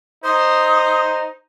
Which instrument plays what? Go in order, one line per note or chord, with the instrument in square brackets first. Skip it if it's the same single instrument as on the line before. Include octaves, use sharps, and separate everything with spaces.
[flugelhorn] D#4 [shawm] C5 [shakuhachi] D#6